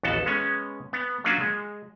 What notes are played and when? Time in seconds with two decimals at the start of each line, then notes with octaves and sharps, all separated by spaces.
0.03 A1 D#2 B3 F#4 A4 A5
0.26 G#3 B3 C#4
0.93 B3
1.24 F#3 A#3 C#4 D4 F4 F#4
1.41 G#3